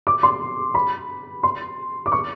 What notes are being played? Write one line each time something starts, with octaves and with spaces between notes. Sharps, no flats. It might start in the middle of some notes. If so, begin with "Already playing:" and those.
D6
C6
B5
C6
D6
C#6